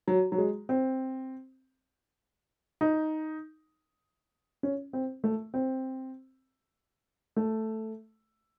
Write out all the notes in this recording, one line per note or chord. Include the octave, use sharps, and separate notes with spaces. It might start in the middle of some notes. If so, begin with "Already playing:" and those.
F#3
F#3
G#3
C4
D#4
C#4
C4
A3
C4
A3